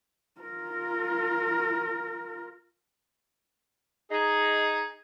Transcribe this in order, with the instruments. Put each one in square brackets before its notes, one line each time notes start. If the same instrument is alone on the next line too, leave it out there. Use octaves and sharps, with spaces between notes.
[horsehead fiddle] F4 A#4
[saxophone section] D#4 G#4